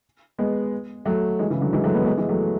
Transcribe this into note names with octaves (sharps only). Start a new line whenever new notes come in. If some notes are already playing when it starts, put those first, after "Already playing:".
G#3 B3
F#3 A3
E3 G#3
C#3 E3
D3 F#3
E3 G#3
F#3 A3
G#3 B3
G#3 B3
E3 G#3
F#3 A3